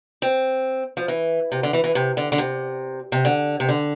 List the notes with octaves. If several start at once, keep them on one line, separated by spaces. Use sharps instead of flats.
C4
F3
E3
C3
D3
E3
E3
C3
D3
D3
C3
C3
D3
C3
D3